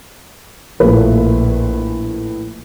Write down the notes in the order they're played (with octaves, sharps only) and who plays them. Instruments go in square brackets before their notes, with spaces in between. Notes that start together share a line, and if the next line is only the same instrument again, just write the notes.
[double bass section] A#1 [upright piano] A2 B4 [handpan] F3 A3 A#3